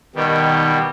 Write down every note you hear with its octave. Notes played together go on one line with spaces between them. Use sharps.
B2 D#3 G3